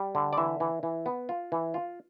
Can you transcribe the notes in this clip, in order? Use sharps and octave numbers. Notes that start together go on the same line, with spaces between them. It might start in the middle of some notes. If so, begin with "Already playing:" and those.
Already playing: G3
D3
D5
E3 E5
E3
E3
B3
F4
E3
F4